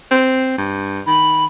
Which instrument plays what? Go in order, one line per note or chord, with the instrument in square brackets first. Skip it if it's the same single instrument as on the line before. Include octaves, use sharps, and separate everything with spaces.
[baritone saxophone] C4
G2
[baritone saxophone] D#3 [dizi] B5